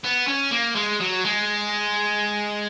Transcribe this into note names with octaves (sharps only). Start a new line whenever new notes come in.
B3
C#4
A#3
G#3
F#3
G#3